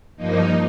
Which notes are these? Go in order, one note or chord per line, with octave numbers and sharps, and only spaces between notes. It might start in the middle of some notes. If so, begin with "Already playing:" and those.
G2 F3 A#3 D#4